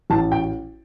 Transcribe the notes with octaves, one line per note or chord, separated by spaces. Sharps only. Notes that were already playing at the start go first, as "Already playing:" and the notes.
A1 A5
G5